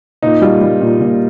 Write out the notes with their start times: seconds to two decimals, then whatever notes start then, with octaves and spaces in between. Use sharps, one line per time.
0.23 A#2 D#4
0.42 G3 F4
0.61 G3
0.82 A#2
1.01 A#2